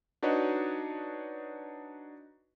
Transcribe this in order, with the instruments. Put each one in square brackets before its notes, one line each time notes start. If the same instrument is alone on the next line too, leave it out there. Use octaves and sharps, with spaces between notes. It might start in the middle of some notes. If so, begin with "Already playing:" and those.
[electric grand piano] D4 D#4 F#4 B4 C#5 D#5